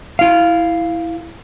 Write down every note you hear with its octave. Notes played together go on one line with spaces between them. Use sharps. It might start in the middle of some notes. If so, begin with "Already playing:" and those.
E4 F5